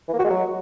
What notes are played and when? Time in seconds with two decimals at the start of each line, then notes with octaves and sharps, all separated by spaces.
0.08 E3
0.14 A#3
0.19 F#4
0.24 G#3
0.30 F#3